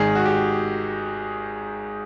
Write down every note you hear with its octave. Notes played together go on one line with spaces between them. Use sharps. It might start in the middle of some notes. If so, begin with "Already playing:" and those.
Already playing: G#1 G#2 D#3 G#4
F#4
G4